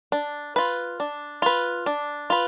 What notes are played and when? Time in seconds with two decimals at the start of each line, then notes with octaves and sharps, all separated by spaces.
0.12 D4
0.56 F4 B4
1.00 D4
1.42 F4 B4
1.86 D4
2.30 F4 B4